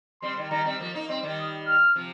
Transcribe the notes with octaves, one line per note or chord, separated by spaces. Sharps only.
G3 C4 C6
D#3 G3
D#3 G3 A#5
G3 C4
F3 A#3
A#3 D#4
G3 C4 C6
D#3 G3
D#6
F6
C3 F3